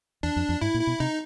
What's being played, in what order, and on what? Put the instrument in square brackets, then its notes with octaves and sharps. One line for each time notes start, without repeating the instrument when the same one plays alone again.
[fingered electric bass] E2 [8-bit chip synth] D4
[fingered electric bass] F2
F2
[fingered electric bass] G#2 [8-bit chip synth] E4
[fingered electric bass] A#2
[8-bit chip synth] E4
[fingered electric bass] B2
[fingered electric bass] C3 [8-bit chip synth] D#4